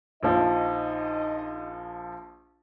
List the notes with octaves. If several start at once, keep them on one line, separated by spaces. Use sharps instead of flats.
A#1 F3 D#4 D#5